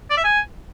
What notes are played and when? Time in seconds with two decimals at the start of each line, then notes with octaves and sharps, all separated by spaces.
0.10 D5
0.17 E5
0.24 G#5